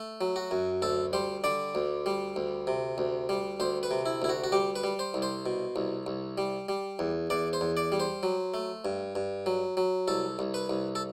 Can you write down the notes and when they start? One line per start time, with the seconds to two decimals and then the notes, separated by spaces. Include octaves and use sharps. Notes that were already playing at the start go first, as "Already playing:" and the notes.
Already playing: A3
0.21 F#3
0.36 F#4
0.51 F#2
0.82 D2 A4
1.13 G3 C5
1.44 D3 D5
1.75 D2
2.06 G3
2.36 D2
2.67 C3
2.98 D2
3.29 G3
3.60 D2 C5
3.83 B4
3.91 C3
4.06 E4
4.22 D2 E4
4.29 F#4
4.44 F#4
4.52 G3 G4
4.76 B4
4.84 G3
4.99 C5
5.14 C2
5.22 C5
5.46 B2
5.76 C2
6.07 C2
6.38 G3
6.69 G3
6.99 E2
7.30 E2 D5
7.53 C5
7.61 E2
7.77 D5
7.92 G3
8.00 C5
8.23 F#3
8.54 A3
8.85 G2
9.15 G2
9.46 F#3
9.77 F#3
10.08 C2 A4
10.39 C2
10.54 B4
10.70 C2
10.95 A4